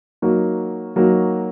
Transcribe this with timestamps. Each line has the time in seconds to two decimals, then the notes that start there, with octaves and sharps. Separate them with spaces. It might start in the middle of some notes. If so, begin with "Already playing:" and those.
0.22 F#3 A#3 D#4 F#4
0.96 F#3 A#3 D#4 F#4